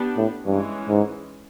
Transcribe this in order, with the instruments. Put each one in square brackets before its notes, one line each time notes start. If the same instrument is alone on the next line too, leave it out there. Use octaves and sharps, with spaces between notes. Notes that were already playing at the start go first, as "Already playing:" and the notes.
Already playing: [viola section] B3 D4 G4
[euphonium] A2
[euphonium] G2 [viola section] E3 G#3 C#4
[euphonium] G#2